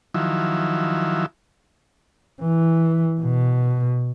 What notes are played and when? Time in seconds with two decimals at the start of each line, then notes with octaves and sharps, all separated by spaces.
0.14 D#3 F3 F#3 E4
2.41 E3
3.20 B2